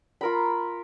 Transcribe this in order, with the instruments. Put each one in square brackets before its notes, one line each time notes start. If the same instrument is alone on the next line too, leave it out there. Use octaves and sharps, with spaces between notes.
[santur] F4 A#4 B5